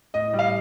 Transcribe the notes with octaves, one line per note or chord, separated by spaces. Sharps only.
A2 D#5
G3
F5